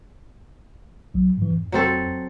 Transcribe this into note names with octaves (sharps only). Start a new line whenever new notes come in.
B1 F#3
G#2 E3
F2
F#3 C4 A4